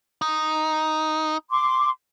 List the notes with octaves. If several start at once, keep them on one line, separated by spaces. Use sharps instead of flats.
D#4
C6 D6